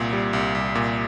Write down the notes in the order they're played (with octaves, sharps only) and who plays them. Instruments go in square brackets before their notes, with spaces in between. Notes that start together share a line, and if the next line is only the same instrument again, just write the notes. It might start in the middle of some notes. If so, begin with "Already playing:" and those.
Already playing: [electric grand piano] C2 A#2
G3
C2
C2
A#2